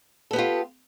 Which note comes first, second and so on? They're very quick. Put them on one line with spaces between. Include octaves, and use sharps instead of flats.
A4 B3 G4 F4